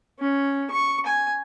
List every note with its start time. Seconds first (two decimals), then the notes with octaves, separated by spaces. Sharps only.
0.19 C#4
0.70 C#6
1.06 G#5